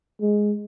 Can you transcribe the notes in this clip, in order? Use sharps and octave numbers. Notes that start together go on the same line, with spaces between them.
G#3